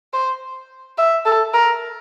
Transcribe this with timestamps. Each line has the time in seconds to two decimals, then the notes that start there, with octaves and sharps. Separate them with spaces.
0.13 C5
0.98 E5
1.25 A4
1.54 A#4